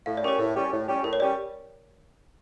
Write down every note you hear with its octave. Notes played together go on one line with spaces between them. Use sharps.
A2 F5
D5
G3 C#4 G4 A#4
C#5
A2
G3 C#4 G4
A2
G3 C#4 G4
A2 A#4
C#5
G3 C#4 G4 D5